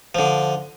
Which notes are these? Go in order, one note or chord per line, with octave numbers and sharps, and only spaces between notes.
D3 F3